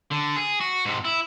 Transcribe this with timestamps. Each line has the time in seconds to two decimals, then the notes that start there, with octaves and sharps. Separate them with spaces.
0.11 D3
0.37 G#4
0.61 F#4
0.86 G#2 C3
1.04 E4